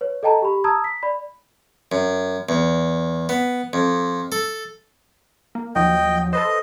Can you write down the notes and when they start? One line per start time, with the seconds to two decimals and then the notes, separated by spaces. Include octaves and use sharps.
0.01 B4 C#5
0.23 A4 D#5 G5 A5 A#5
0.42 G4 B5
0.64 A5 A#5 D#6 E6 G#6
0.84 B6
1.03 D5 B5
1.92 F#2
2.49 E2
3.29 B3
3.73 F2
4.32 A4
5.55 A#3
5.75 D#2 F3 F#3 D#5 G5
6.33 A4 B4 C5 D#5